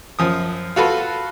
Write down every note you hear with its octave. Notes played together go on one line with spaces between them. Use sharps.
F#2 F3 D#6
F4 F#4 A4 B4